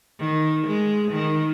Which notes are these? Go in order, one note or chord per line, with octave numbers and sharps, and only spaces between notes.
D#3
G#3
D#3